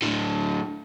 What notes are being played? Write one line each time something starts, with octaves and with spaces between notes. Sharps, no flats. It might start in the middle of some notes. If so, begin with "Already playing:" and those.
A2 D3